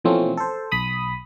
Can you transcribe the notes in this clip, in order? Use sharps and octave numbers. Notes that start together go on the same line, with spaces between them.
B2 E3 F3 A3 C4 C#4
A4 C5
B1 B5 D#6